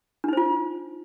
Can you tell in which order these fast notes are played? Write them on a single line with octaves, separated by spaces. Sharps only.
D4 D#4 C5 F4